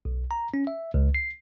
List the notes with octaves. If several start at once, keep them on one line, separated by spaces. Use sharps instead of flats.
B1
A#5
C#4
E5
C#2
C7